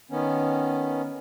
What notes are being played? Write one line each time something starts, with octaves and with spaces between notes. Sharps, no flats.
D#3 B3 C#4